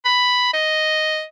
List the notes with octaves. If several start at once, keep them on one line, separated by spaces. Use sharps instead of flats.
B5
D#5